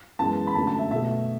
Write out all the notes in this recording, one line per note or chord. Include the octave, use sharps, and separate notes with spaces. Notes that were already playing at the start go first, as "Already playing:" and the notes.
F#2 E3 G#3 B3 A5
B5
F#2 D3 F#3 A3 A5
A5
E5
B2 A3 E5